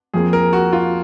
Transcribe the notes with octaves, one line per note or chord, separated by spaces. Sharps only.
F2 F3 A#3 G#4
A#4
F#4
F4